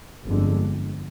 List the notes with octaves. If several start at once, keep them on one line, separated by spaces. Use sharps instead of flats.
G1 F2 D3 G#3